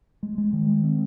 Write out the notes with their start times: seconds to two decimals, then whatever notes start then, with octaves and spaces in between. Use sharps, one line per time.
0.23 G#3
0.38 G#3
0.53 D#3
0.69 G#3
0.84 C4